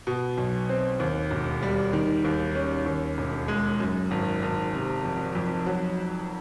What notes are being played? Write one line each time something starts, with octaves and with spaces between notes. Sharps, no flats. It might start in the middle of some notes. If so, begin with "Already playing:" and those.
B2
B1
C4
D#2
E1
G3
D#3
D#2
C#4
D#2
E1
G#3
F#2
G#1
G#1
C3
F2
F2
F#3